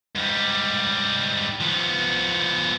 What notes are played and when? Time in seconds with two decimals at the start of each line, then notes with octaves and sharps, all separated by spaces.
0.16 G#2 G3
1.60 F3 B3